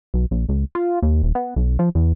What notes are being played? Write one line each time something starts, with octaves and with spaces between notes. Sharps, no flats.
B1
A#1
C#2
F4
D#2
D#1
B3
B1
F3
E2